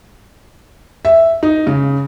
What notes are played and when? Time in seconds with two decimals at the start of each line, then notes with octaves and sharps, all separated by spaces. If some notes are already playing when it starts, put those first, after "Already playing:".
1.05 E5
1.43 D#4
1.67 C#3